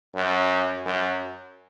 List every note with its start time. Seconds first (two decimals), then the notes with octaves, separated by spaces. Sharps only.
0.15 F#2
0.86 F#2